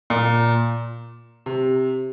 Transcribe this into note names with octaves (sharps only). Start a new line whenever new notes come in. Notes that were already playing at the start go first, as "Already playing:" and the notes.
A#2
C3